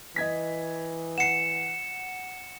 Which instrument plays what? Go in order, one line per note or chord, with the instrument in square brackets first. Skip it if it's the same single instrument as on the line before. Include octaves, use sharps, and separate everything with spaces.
[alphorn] E3 [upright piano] D#5 G#6 B6
[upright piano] F#5 C7 [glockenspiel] C#7 E7